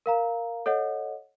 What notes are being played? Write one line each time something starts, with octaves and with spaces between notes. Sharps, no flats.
A#4 F5 A#5
A4 C#5 D#5 F#5